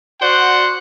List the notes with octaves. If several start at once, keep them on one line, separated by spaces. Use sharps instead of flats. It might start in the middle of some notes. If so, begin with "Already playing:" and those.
F#4 C5 D5 F#5